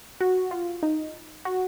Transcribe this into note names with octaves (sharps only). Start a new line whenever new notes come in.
F#4
F4
D#4
F#4